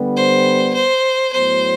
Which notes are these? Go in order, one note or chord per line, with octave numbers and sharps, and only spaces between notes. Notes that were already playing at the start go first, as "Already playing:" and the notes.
Already playing: D3 G3 B3
C5
C5
A2 F#3 B3 C5